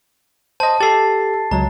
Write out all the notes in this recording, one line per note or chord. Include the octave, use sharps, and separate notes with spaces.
C5 D#5 A5
G4 A4 A6 C7
C#2 F#3 A#5